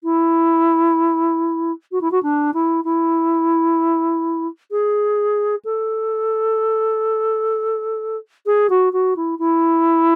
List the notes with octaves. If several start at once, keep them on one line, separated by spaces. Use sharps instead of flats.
E4
F#4
E4
F#4
D4
E4
E4
G#4
A4
G#4
F#4
F#4
E4
E4